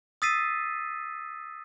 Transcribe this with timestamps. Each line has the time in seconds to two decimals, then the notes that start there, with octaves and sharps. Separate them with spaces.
0.22 D#6 E6 A6 B6 C7 D#7